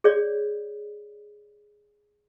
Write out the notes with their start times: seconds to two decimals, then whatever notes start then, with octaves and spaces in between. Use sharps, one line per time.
0.04 G#4 C#5 D5